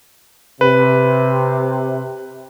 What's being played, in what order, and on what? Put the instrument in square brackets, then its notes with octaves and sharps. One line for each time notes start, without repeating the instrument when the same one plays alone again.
[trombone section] C3 [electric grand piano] B4